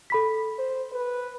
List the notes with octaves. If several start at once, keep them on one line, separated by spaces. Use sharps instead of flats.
A4 B5 B6
C5
B4